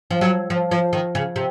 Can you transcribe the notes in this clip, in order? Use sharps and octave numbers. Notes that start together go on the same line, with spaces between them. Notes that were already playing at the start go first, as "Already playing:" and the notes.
F3
F#3
F3
F3
D#3
C#3
C3